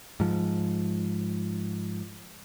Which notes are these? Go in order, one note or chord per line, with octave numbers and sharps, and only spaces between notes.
G#2 F3